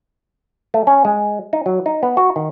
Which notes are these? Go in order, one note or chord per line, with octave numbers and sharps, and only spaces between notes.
A3
C#4
G#3
D#4
F#3
D#4
B3
F#4
D#3